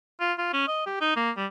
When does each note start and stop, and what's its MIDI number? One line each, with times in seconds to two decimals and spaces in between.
0.20 0.33 65
0.38 0.52 65
0.54 0.67 61
0.68 0.85 75
0.86 0.99 67
1.01 1.13 63
1.16 1.31 58
1.37 1.46 55